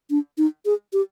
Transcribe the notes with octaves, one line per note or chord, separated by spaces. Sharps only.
D4
D#4
G#4
G4